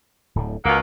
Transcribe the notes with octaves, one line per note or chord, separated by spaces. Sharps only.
D1 A2 D3
C#2 B2 F#3 A#3